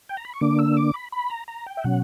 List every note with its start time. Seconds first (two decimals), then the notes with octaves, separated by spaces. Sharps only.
0.09 G5
0.17 A#5
0.25 B5
0.34 C#6
0.41 D3 A#3 D4 D6
0.59 E6
0.77 D6
0.94 B5
1.12 B5
1.30 A#5
1.48 A#5
1.66 G5
1.77 E5
1.84 B2 F#3 C#4 F#5